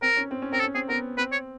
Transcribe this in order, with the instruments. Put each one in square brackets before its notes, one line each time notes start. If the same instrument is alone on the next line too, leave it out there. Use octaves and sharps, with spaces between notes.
[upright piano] C4 [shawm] A#4
[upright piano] C#4
C4
C#4
[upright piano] C4 [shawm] A#4
[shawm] A4
[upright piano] C#4
[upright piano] C4 [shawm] G#4
[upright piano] B3 [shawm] A#4
[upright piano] C4 [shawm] B4
[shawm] C#5